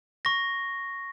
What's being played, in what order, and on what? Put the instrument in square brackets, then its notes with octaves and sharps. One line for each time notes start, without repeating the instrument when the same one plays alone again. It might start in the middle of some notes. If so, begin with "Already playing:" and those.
[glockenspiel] C#6 A#6